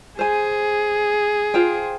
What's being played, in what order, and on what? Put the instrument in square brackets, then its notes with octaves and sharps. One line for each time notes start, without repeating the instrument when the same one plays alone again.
[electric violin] G#4 [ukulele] C5 G#5
[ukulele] F4 C5 G5